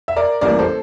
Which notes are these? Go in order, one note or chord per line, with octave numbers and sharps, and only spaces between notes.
E5
A#4 D5
A1 A2 G3 A#3 A#4 D5
A4 C5